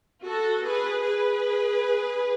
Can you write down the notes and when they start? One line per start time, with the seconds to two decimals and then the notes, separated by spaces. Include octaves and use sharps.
0.25 F#4 A4
0.65 G#4 B4
1.03 G#4 B4